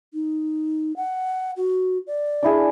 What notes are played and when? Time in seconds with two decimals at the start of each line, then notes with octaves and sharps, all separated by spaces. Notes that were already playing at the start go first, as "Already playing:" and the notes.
0.14 D#4
0.97 F#5
1.57 F#4
2.07 D5
2.43 D4 E4 G#4